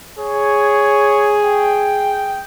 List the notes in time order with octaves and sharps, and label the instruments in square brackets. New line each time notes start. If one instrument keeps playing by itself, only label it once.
[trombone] G#4 [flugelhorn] C#5
[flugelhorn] G5